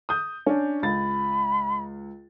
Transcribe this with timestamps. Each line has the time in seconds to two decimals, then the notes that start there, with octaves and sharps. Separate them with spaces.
0.09 D#6 G6
0.46 C#4 D4
0.83 C#2 B5 A6